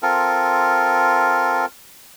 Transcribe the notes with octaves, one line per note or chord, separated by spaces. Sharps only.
C4 F4 A4 A#4